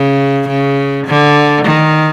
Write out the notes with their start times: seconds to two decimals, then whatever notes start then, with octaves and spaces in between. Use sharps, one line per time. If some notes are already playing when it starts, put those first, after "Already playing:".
Already playing: C#3
0.48 C#3
1.06 D3
1.65 D#3